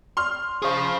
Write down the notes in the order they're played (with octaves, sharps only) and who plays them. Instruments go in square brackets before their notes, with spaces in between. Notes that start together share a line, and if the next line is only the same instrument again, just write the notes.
[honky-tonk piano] C6 F6
[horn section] F3 [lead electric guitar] G#4 F5 [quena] C#6